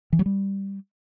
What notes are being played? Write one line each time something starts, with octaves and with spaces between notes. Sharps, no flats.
E3
F#3
G3